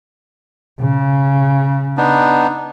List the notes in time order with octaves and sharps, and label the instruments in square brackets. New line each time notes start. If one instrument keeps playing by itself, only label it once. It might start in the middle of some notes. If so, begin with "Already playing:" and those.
[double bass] C#3
[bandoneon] B3 D4 D#4